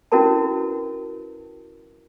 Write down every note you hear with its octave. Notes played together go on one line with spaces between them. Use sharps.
C#4 E4 F#4 A#4 B4 A5